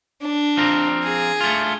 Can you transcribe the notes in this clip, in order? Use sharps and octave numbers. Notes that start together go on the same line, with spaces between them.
D4
F3 C4 A#4
G#4
A3 F4